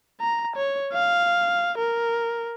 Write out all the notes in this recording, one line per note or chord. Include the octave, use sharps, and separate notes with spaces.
A#5
C#5
F5
A#4